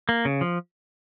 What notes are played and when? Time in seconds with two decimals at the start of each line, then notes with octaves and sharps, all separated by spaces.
0.09 A#3
0.25 C#3
0.41 F3